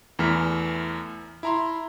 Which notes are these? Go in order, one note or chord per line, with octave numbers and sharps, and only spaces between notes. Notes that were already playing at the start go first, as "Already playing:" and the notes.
E2 E3 A3 F6 B6
E4 A#5 C6